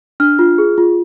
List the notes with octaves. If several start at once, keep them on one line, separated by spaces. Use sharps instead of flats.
D4 F6
F4
G#4
F4